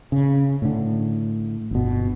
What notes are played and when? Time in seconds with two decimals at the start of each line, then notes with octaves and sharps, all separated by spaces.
0.12 C#3
0.62 A2 D3
1.71 G1 B2